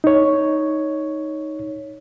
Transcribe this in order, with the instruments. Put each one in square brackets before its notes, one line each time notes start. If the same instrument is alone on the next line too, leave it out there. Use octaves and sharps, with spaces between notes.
[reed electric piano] D#4 C#5